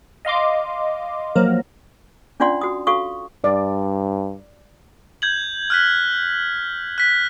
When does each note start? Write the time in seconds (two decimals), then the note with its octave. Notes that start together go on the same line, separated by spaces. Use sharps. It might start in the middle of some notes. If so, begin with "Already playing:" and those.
0.25 D#5 F5 C6 D6
1.35 F3 F#3 A#3 A#4
2.40 C#4 D4 F4 D5 F#5 C6
2.61 F#4 D#6
2.87 F#4 A4 F5 C#6 D#6
3.44 G2 D5
5.22 G6 G#6 F#7
5.70 F6 F#6 B6
6.98 F#6 B6